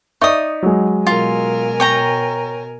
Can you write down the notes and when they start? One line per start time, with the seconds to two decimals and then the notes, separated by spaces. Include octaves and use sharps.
0.21 D#4 D5 E5 C#6 D#6
0.63 F#3 G#3
1.07 B2 F4 A#4 G#5
1.80 C#5 G5 A#5